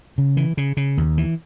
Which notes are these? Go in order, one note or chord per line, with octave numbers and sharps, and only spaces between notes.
C#3
E3
C#3
C#3
D#2
E3